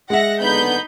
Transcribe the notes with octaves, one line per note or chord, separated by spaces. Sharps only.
G#3 E5 F#5 A#6
F#1 D3 B3 D#4 B5 G6